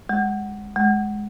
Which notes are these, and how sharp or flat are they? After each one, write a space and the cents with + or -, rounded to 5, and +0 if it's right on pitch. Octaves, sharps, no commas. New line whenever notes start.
G#3 -15
G#3 +10